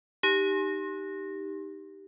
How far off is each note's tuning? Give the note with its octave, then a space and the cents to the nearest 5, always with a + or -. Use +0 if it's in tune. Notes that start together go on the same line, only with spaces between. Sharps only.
D#4 +0 G4 +0